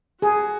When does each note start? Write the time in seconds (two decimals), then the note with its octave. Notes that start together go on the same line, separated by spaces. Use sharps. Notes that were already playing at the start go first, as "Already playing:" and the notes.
0.22 F#4 G#4